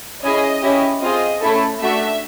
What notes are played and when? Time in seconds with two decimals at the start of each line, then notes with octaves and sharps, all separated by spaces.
0.23 C#4 E4 G#4 D#5
0.62 C#4 E4 G4
1.02 C4 F4 G#4 D#5
1.41 A3 C#4 E4 A4
1.80 A3 D4 F#4 E5